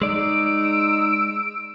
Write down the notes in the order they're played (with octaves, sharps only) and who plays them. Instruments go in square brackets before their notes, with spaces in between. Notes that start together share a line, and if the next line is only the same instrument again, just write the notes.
[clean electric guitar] G#3 D5 [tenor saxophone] D#4 [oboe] E6 [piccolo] D7